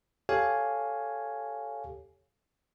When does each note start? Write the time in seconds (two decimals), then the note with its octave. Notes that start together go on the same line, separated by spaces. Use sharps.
0.29 G4 A4 C#5 F5 G#5